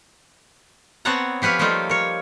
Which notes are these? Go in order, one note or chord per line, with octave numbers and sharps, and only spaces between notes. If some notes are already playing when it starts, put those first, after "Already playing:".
B3 C4 C#5 F#5 A5 A#5
F3 G4 B4 C#5 F5
F3 G3 A3 A#3 D#4 F4
A#4 C#5